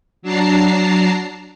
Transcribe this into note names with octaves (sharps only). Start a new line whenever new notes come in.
F#3 D4 A5 A#5 C7